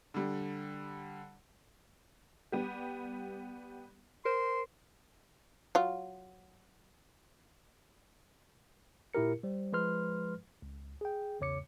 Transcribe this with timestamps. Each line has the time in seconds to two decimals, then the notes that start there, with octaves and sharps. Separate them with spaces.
0.14 D3 G3
2.52 G3 B3 G4
4.25 A#4 C5 C6
5.75 F#3 F4
9.14 A#2 E4 G4 A#4 C#7
9.43 G3 C5
9.73 F3 G#3 B4 C6 F6
10.62 C#2
11.01 G#4 G5
11.40 B1 E2 C#3 C#5 D6 C#7